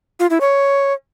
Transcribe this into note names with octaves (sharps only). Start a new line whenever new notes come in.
F4
E4
C#5